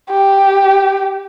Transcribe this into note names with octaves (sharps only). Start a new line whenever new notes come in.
G4